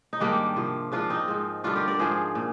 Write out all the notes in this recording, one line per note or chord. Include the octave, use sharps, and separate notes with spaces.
D#4
G#2 D#3 G3 A#3 D4
C3 F3
G#2 F3 D4 F4
C4 D#4
G#2 F3
G2 D3 F3 D4 F4
G4 A#4
A#4 D5
G#2 F3 G#4 C5
A#2